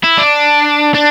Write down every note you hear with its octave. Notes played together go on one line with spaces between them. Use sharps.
E4
D4
D4